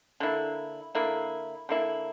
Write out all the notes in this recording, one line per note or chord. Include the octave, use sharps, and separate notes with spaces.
D3 A#3 E4
D3 A#3 E4
D3 A#3 E4